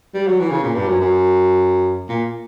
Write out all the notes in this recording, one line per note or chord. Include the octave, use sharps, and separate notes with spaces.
G3
F#3
E3
C#3
A#2
G2
F#2
F#2
A#2